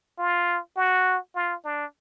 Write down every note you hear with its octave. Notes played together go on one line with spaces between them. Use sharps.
F4
F#4
F4
D4